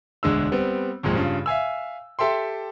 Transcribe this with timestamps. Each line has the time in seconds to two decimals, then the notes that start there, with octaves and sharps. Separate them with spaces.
0.23 E1 D2 G#3 D4 E6
0.52 G3 B3 C4
1.03 G#1 F2 A#2 G#3
1.15 G2 C#3 F4
1.46 E5 F5 G#5 E6
2.19 G4 A4 E5 G5 C6